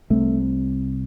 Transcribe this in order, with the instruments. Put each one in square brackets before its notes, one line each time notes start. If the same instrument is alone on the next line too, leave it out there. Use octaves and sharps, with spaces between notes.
[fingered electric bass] C2 C3 A3